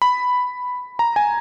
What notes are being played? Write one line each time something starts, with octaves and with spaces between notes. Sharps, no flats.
B5
A#5
G#5